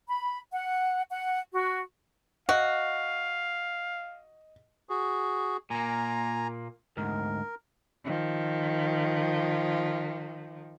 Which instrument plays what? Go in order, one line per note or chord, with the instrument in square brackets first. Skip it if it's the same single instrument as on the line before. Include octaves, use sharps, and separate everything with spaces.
[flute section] B5
F#5
F#5
F#4
[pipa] F#4 [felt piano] D#5 [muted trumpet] F5
[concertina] F#4 G#4
[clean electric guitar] A#2 A#3 [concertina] G#5 A#5
[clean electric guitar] D2 G#2 [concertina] A#4
[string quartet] D#3 F3